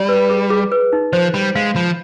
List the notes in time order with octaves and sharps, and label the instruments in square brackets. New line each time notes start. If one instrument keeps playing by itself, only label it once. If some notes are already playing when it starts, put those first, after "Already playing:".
Already playing: [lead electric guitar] G3 [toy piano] D5
[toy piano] B4
G#4
G#4
B4
D#4
[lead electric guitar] F3 [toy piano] C5
[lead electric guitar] G3 [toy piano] B5
[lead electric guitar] G#3 [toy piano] F5
[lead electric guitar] F3 [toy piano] B5